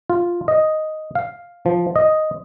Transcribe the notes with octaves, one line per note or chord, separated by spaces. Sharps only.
F4
D#5
F5
F3
D#5